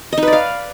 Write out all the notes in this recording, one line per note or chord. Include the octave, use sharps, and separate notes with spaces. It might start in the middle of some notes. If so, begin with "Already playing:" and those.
D#5
D#4
B4
D5
F5